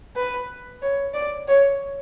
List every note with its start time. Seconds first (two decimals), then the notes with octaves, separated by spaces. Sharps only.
0.16 B4
0.82 C#5
1.14 D5
1.48 C#5